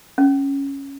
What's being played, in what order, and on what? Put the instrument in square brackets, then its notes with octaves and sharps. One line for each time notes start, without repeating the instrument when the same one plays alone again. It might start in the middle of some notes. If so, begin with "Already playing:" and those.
[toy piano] C#4